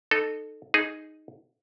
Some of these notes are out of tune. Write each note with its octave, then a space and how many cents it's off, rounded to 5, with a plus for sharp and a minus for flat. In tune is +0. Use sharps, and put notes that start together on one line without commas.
D#4 -25 A4 +0
D#4 +0 G#4 +0